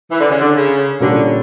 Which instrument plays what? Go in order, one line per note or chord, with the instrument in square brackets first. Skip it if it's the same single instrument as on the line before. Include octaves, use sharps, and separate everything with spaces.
[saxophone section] E3
D3
C#3
D3
C#3
[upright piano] A#2 G3 A#3 C#4 [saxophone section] D3